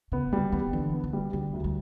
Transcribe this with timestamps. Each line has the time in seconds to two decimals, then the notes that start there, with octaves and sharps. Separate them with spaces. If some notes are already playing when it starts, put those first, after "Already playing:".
0.12 C#3 B3
0.32 D3 G3
0.52 D#3 B3
0.73 D3 E3
0.93 B3
1.04 D3
1.13 G3
1.33 D3 G3
1.53 D2
1.64 G3